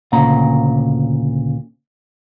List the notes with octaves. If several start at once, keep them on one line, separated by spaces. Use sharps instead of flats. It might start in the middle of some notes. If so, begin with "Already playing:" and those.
D2 A#2 C#3 A#5